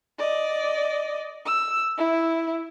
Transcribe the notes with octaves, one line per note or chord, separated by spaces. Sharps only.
D5 D#5
E6
E4